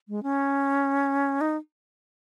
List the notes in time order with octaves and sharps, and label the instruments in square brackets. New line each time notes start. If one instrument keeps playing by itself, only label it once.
[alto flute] G#3
C#4
D#4